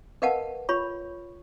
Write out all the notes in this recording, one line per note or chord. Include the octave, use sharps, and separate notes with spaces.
A#4 B4 D#5 F5 F#5 A5
F4 C#5 B5 C#6